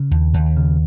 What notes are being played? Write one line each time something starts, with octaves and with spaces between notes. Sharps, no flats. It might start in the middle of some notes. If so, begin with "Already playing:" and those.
Already playing: C#3
D#2
D#2
C#3